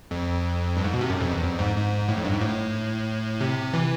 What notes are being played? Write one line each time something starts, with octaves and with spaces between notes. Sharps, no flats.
F2
G2
G#2
B2
C3
F#2
F2
E2
F2
G#2
G#2
A2
F2
G2
G#2
A2
C3
E3